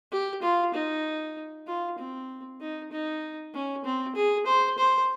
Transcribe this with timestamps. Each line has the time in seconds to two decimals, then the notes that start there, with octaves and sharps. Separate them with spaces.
0.11 G4
0.42 F4
0.74 D#4
1.67 F4
1.98 C4
2.60 D#4
2.91 D#4
3.54 C#4
3.84 C4
4.15 G#4
4.46 C5
4.78 C5